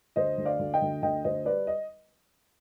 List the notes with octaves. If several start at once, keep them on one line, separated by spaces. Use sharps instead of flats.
D2 C5 D#5
D2
D5 F5
D2
D#5 G5
D2
D2 D#5 G5
D2 C5 D#5
G3 B4 D5
D#5